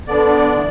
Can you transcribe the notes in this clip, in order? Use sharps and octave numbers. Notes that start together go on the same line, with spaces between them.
D3 B3 D4 D5
E3 A3